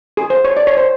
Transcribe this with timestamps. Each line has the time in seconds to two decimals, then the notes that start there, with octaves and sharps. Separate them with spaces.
0.17 G#4
0.30 C5
0.45 C#5
0.57 D5
0.67 C#5
0.77 C5